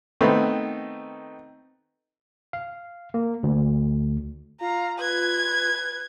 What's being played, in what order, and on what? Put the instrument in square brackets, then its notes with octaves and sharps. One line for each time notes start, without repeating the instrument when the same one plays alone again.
[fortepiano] D#3 A3 B3 C4 D#4
[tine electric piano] F5
A#3
D2
[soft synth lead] F4 [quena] F5 [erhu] A#5
[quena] B4 [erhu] G#6